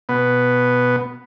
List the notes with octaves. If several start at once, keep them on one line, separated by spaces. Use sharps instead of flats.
B2 B3